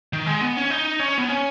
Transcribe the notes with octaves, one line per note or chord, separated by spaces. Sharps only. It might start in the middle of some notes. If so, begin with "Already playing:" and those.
D#3
G#3
B3
C#4
D#4
C#4
B3
C#4